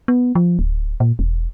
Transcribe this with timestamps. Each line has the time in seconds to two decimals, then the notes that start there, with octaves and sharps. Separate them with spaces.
0.08 B3
0.35 F3
0.59 D1
1.00 A#2
1.19 E1